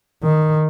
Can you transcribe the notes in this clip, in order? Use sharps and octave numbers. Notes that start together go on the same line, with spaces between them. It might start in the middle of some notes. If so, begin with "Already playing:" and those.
D#3